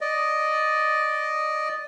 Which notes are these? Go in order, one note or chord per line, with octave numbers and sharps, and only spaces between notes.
D5 D#5